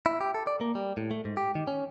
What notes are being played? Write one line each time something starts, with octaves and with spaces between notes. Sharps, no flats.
E4
G4
A4
D5
A#3
G3
A2
A3
G#2
G4
D#3
C#4